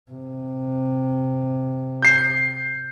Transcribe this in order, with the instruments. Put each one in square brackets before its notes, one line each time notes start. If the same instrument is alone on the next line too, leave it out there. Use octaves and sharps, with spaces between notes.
[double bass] C3
[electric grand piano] G6 C7